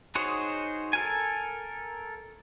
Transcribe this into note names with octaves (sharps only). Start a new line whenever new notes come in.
D#4 F#4 G#4 C5 C#5
A4 A#4 G#5